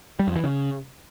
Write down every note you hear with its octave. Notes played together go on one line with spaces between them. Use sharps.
G3
F2
E3
C#3